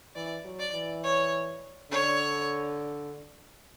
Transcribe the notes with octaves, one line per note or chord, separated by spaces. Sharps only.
E3 D5
F#3
D5
E3
C#5
D3 C#5